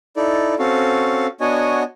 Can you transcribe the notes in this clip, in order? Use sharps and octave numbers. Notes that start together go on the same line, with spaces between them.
D#4 E4 A4 D5
C4 C#4 F#4 A4 F5
B3 D4 F#4 C#5 D#5 G#5